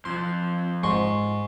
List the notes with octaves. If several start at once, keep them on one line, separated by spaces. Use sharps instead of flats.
F2 F3 C6
G#2 C6 C#6